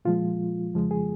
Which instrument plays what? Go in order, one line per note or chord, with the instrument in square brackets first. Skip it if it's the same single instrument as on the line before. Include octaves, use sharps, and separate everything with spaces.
[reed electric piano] A#2 F3 G#3 F4
F2 C#3 F3 G#3
G#4